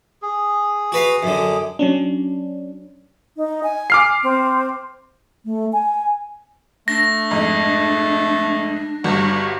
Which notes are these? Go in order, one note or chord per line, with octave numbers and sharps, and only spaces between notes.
G#4
F#4 B4 F5
F#2 D3
F#3 C#4 D4
D#4
G#5
D6 F6 C7
C4
A3
G#5
A3 D4 A#6
F2 G#2
G1 G2 F#4